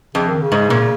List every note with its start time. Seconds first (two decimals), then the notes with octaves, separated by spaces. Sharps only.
0.15 F2 C#3
0.29 D#3
0.42 C#3
0.52 G#2
0.70 A#2